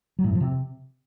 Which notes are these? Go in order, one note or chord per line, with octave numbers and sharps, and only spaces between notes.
F#3
A2
F2
F3
C3